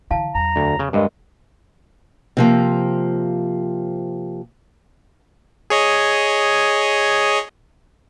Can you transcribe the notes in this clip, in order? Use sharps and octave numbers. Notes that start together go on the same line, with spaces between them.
D3 E3 E4 F5 A5
E2 F#3 A#5
D2
C#3
G2 G#3 G4 A#4 D#5
C3 F3 A#3
G#4 C#5 D#5